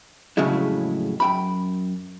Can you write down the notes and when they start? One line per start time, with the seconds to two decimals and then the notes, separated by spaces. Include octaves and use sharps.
0.37 F2 A2 C#3 F#3 G#3 E4
1.20 F#2 G5 B5